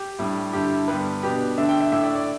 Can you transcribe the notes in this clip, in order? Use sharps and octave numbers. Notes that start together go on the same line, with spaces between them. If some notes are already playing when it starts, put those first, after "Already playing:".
Already playing: G4
A2 G3 D4
G2 D3 G3 E4 G4
G2 D3 G3 B3 B4
B2 B3 D4 G4
D3 A3 D4 E5
G5
E5
A2 A3 D4 E5
D5
D5